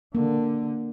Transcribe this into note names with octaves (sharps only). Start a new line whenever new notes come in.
D3 A#3